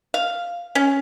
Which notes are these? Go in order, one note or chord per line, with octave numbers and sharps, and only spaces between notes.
F5
C#4